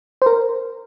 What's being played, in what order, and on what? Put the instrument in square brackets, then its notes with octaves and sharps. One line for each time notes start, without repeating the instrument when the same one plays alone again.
[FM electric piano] C5
A#4